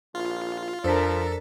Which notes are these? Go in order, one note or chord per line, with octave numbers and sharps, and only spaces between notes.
A#1 F4
F2 F3 D4 A4 A#4 C5 B6